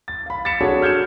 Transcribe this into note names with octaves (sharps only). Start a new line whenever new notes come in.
A6
F5 B5
A6 B6 C#7 E7
D4 F#4 G#4 A4 C#5
F6 G6 G#6 C#7 E7